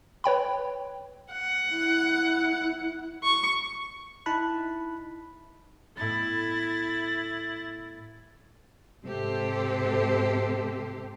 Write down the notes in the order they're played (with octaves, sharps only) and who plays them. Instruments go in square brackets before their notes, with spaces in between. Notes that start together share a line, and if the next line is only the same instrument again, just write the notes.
[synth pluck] B4 C#5 G5 B5
[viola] F#5
[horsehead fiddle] E4
[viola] C#6
[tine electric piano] D#4 E4 A5 B5 F#6
[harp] A2 B3 [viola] E4 [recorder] A6
[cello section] G#2 C3 G4 A4 C5